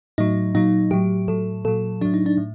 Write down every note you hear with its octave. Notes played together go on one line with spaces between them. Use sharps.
A2 F#3 D#4
A#2 F#3 D#4
A2 F#3 G4
A2 F#3 A4
A#2 F#3 A4
A2 F#3 D4
D#4
D4
A2